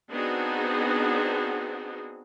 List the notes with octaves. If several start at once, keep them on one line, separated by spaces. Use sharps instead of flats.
B3 C4 D4 D#4 F#4 G#4